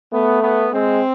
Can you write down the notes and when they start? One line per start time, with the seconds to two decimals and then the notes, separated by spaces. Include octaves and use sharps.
0.12 A3 B3
0.42 B3
0.73 G#3 C4